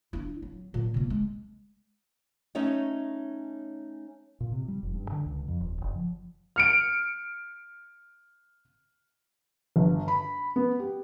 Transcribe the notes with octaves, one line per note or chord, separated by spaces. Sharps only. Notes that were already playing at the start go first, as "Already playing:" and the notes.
D4 E4
F#3
A#2 F#3
C3 A#3
G#3
A3 C#4 D#4 C#5 D#5
A#2
C3
G3
F1
G2
D3
C#2
F2
D#1
F#1
F3
F6 C#7 D7
G1
B5
B3
G4